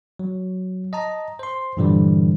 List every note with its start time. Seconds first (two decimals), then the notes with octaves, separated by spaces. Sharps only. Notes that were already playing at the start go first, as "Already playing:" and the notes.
0.19 F#3
0.93 D#5 A5 A#5
1.39 C5 C6
1.77 G2 A#2 D3 E3 F3 G3